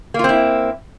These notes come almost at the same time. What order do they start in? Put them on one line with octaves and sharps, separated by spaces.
A#3 F4 C4 E4